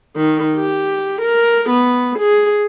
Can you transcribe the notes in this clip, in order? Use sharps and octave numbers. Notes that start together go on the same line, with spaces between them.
D#3
G4
A#4
B3
G#4